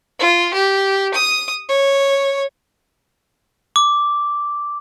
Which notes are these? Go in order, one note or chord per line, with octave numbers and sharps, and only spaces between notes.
F4
G4
D#6
C#5
D6